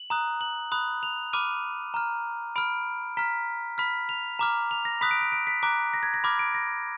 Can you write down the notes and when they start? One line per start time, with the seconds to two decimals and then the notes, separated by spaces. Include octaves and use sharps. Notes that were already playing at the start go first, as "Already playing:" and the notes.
Already playing: F#7
0.10 A#5 D#6 F#6
0.41 F#7
0.72 B5 D#6 F#6
1.03 F7
1.33 B5 D6 F6 D#7
1.94 A#5 F6
2.56 B5 F6 D7
3.17 A#5 F6 B6
3.78 B5 F6 B6
4.09 F7
4.39 A#5 D6 F6
4.71 F7
4.85 A#6
5.01 B5 D#6 F#6 B6
5.11 D7
5.21 D7
5.32 D7
5.47 B6
5.63 A#5 D6 F#6 D7
5.94 A#6
6.03 G#6
6.14 A#6
6.24 B5 D6 F6
6.39 D7
6.55 A#6